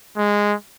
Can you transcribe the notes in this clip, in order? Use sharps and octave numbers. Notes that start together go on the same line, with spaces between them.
G#3